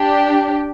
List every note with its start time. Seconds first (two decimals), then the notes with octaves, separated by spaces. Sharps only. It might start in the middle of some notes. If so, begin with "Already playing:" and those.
Already playing: D4 G4